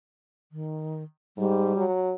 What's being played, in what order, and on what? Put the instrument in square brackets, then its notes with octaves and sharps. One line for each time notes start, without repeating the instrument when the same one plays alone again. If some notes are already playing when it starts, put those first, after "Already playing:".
[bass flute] D#3
[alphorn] G#2 [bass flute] G3
[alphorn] F#3